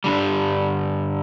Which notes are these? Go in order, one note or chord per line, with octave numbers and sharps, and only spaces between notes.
G2 D3 G3